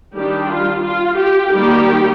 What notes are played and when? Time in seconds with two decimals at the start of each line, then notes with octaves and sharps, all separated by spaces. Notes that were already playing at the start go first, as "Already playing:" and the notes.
0.14 D#3 G3 D4 G4
0.48 F4
0.83 F4
1.17 G4
1.51 D#3 G3 A#3 G4